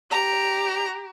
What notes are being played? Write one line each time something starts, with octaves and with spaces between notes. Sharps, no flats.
G4 A#5